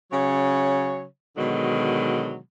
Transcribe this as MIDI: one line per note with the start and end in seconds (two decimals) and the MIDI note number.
0.12 1.03 49
0.12 1.03 54
0.12 1.03 73
1.37 2.38 47
1.37 2.38 50
1.37 2.38 51
1.37 2.38 54
1.37 2.38 56